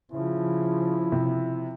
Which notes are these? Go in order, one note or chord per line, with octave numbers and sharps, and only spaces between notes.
C#3 F3 E4
C3